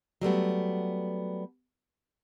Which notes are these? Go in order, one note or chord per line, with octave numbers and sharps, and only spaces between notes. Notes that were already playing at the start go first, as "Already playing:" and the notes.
F#3 G3 A3 B3